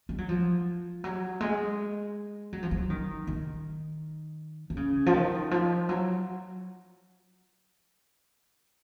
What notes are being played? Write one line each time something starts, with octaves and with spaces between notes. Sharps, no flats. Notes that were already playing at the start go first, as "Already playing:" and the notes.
G#3
F#3
F3
F#3
G#3
F#3
F3
F#3
D#3
D#3
D#3
C#3
F3
D#3
F3
F#3